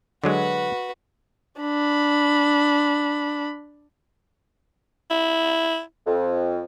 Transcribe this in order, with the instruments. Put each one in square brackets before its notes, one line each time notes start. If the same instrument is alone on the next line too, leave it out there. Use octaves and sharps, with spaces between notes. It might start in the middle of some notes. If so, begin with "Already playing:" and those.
[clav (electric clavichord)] D3 F#3 G#3 [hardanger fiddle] F#4 B4
[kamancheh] D4 B5
[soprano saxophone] E4
[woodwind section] F2